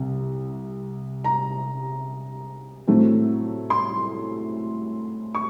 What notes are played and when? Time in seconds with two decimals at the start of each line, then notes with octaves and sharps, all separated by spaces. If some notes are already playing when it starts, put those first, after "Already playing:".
Already playing: C2 C3
1.24 A#5
2.87 A2 F#3 A3 C4
3.70 C6
5.35 C#6